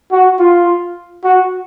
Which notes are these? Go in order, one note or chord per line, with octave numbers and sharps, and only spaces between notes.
F#4
F4
F#4